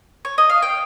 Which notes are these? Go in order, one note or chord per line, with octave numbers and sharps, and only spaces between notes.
C#5
D#5
F5
G5